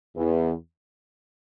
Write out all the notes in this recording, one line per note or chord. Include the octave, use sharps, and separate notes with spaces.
E2